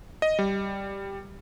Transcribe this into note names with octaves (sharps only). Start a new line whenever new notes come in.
D#5
G3